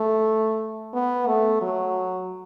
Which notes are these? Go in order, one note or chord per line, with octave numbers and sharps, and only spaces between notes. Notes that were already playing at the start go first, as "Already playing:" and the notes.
Already playing: A3
B3
A3
F#3